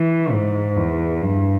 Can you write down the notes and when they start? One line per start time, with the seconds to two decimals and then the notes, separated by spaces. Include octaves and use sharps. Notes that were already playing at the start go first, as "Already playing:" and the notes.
Already playing: E3
0.32 G#2
0.77 E2
1.22 G2